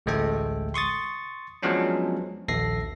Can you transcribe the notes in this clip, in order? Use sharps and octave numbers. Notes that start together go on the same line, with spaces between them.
A1 D2 G#3 A3 A4 G5
C6 C#6 D#6 A6
F3 F#3 G#3 B3 C#4 D4
A#1 D#2 A4 A#6 C7